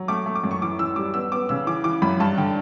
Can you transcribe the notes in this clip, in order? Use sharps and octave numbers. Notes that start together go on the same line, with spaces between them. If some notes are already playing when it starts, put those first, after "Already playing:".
Already playing: F#3
A3 D6
A3
D6
F#2
C#6
E3 D6
E3 E6
G3 D6
B3 E6
B3 D6
C#3 E6
E3 D6
E3 D6
F#2 B5
G2 A5
D3 G5